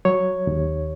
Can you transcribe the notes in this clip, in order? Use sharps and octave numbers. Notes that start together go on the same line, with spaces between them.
F#3 C#5
D#2